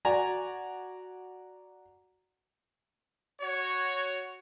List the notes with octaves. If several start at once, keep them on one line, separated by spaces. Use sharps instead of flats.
F#4 D5 G#5 A#5
F#4 C#5